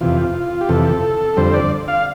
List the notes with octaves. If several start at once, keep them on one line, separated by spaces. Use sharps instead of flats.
F2 C3 E3 F4
G4
F2 C3 E3 A4
F2 D3 G3 C5
D5
F5